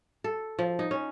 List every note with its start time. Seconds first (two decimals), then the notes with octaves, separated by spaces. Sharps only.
0.24 A4
0.59 F3
0.79 D#4
0.91 C#4